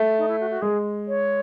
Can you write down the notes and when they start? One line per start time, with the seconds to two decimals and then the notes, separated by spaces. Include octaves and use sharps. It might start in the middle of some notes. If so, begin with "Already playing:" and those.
Already playing: A3
0.18 D#4
0.28 E4
0.40 F#4
0.50 F#4
0.62 G#3 G#4
1.08 C#5